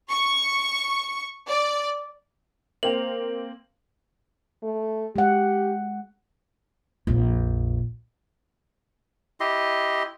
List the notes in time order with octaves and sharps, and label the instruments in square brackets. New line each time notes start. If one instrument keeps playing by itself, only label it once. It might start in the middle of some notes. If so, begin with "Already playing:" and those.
[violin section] C#6
D5
[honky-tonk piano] A#3 C4 [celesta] C5 G5 F7 [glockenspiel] F#7
[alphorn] A3
[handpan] G#3 F#5 [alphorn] G4
[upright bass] A#1 F2
[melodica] E4 G4 D#5 C6